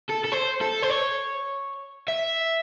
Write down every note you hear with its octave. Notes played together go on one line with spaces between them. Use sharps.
A4
A4
C5
A4
C5
C#5
E5